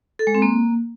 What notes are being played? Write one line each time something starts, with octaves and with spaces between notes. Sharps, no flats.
A4
G#3
C4
A#3